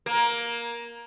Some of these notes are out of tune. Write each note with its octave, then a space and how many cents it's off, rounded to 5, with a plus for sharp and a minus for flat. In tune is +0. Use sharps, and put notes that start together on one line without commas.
A#3 +15